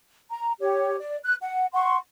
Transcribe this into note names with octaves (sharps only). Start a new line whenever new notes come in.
A#5
G4 C#5
D5
F#6
F#5
F#5 C6 C#6